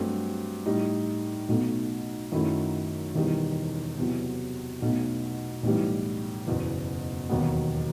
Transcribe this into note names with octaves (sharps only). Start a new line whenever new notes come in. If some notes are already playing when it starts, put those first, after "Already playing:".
Already playing: G2 F#3 A3 C4
A2 G3 D#4
B1 B2 A3
F#2 D#3 F#3 A3 E4
E1 E2 D#3 G3
E2 C3 F#3
B1 B2 A3
B1 A2 E3 G3
F#1 E2 B2
E1 D#2 D#3 F#3 B3